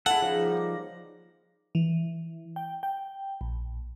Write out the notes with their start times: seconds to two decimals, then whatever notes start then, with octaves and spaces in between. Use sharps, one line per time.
0.06 E4 G#4 A4 F#5
0.22 C#3 F3 D#4 B4
0.45 G3 A#3 D5
1.75 E3
2.56 G5
2.83 G5
3.41 A#1